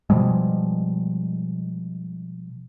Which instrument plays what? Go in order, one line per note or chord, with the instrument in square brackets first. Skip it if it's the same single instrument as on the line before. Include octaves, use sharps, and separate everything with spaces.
[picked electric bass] B2 F3 G3 G#3